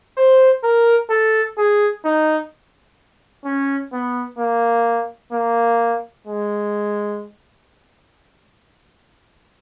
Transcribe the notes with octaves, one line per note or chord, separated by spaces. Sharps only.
C5
A#4
A4
G#4
D#4
C#4
B3
A#3
A#3
G#3